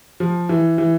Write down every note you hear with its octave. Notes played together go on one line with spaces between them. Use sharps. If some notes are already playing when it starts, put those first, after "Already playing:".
F3
E3
E3